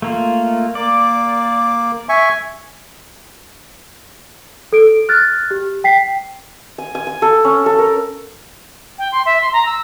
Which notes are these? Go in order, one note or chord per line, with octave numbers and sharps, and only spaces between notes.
A3 A#3 F4
A#3 D5 D6
E5 G#5 C#6
A4 D7
F6 F#6 A6
G4
G5 B6 C7
G#5
G#5
G#5
A4
C#4
A4
A#4
G5
C6
E5
C6
A#5
E6